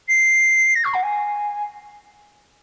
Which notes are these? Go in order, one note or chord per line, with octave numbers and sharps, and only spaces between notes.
C7
A#6
C#6
F#5
G#5